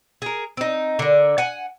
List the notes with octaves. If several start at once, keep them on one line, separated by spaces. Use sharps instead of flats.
G#4 A#4
C4 D#4
D3 A#4
F#5 G#5